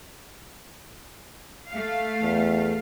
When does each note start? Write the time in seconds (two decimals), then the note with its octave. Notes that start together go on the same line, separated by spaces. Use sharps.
1.69 A3 F5
2.22 E2